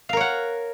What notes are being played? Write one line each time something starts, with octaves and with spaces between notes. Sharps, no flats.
A#4 C#5 F5 F#5